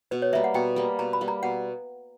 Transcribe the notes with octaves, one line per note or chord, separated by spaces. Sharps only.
B2 B4
C#5
G3 A#3 E5
F#5
B2 G5
G3 A#3
B2 A#5
B5
G3 A#3
A#5
B2 F#5